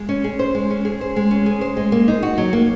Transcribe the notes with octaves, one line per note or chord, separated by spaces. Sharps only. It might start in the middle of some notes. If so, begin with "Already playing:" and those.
Already playing: G#3
C#4
G#4
C5
G#3
C#4
G#4
C5
G#3
C#4
G#4
C5
G#3
A#3
D#4
F#4
F#3
A#3